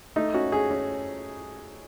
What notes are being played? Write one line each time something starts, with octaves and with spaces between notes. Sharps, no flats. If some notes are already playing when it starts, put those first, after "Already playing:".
A3 D#4
C#4 F#4
C#4 G#4
C#4